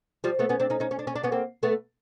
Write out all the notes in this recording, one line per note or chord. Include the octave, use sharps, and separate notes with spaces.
F3 G3
A3 B3
B3 C#4
C4 D4
C#4 D#4
C#4 D#4
C#4
D4
C#4
D4
B3 C#4
A#3 C4
A3 B3